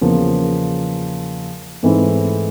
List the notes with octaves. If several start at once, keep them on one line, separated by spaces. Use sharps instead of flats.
E2 C#3 F3 A#3
G#2 E3 A3 C4 E4